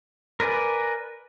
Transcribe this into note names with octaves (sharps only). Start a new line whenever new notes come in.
A#4 B4 D5 G#5